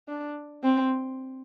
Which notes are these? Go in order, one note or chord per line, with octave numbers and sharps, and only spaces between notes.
D4
C4